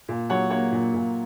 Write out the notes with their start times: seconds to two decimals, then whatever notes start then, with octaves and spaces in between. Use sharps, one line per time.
0.09 A#2
0.30 F#3 C#5 F#5
0.50 A#3 C#5 F#5
0.72 A#2
0.94 A#2